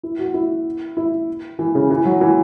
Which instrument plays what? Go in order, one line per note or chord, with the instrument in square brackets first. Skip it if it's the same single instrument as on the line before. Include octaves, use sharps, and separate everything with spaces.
[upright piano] E4
F#4
E4
E4
E3
C#3
E3
F#3
E3